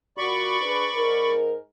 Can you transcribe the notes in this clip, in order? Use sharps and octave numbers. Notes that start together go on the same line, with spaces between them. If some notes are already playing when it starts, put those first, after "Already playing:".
A#2 F#4 D5 B5 C#6
D4 G#4 B4
G#2 A#4